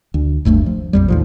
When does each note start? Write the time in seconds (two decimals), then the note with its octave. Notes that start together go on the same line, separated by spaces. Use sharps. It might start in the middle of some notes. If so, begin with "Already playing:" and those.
0.14 D2
0.45 F#1 D2 G2 A3
0.66 F3
0.93 A#1 F2 G3
1.08 D#2 A2 F3